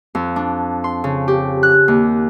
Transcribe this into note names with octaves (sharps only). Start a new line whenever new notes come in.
F2
D4
C6
C#3
G4
F#6
D#2